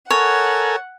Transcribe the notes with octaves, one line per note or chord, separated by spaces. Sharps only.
A4 A#4 C#5 F#5 G#5